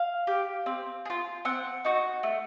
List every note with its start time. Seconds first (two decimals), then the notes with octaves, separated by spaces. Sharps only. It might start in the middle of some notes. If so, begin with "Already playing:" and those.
Already playing: F5
0.27 G4
0.66 C4
1.05 G#4
1.10 F4
1.45 C4 F#5
1.85 D#4 F#4
2.23 A3